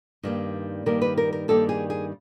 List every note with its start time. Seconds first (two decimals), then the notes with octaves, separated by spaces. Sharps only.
0.23 G2 D#3 G3 A#3
0.86 G2 D#3 G3 A#3 A#4
1.02 B4
1.18 A#4
1.33 A#4
1.48 G2 D#3 G3 A#3 A4
1.69 G#4
1.90 G#4